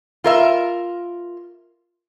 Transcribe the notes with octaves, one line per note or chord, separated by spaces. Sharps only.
F4 A#4 E5